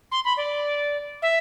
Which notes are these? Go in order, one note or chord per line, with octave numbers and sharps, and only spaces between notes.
C6
B5
D5
E5